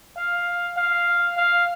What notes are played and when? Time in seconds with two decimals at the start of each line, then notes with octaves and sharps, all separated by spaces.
0.17 F5
0.77 F5
1.37 F5